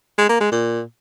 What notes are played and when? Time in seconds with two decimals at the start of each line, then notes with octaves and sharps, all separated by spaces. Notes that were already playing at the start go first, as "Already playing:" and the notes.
0.18 G#3
0.29 A#3
0.40 G#3
0.52 A#2